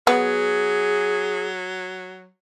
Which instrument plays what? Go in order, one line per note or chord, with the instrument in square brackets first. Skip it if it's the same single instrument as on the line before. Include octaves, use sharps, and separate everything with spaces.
[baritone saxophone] F#3 [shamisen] B3 [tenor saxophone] G#4